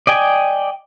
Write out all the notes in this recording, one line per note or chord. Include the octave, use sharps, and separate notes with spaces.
D5 D#5 G5 G#5